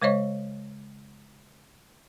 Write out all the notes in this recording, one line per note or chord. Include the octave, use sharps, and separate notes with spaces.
C#3 G#3 C5 C#5 D#5 C#6